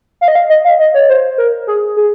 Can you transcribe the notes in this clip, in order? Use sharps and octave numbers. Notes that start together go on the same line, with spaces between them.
F5
D#5
F5
D#5
F5
D#5
C#5
C5
A#4
G#4
G#4